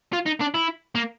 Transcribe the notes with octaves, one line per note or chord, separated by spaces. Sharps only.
F4
D#4
D4
E4
A#3